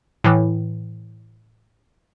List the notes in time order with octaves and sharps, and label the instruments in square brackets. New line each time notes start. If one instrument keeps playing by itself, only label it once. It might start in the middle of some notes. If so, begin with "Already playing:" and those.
[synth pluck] A2 E3